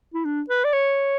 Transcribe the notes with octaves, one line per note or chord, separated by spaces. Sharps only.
E4
D4
B4
D5
C#5